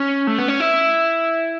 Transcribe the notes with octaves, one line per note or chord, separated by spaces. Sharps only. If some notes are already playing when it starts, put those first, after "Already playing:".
Already playing: C#4
A3
B3
C#4
E4